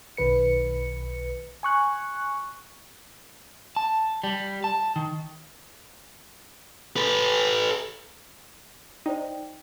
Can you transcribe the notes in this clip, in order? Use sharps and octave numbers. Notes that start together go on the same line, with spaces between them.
B1 D#3 B4 C#7
G#5 C#6 F#6
A5
G3
A5
D#3
A4 B4
D#4 C5 D5 G5